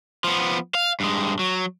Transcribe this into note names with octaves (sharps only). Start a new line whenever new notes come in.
F3 B3
F5
G2 G#3
F#3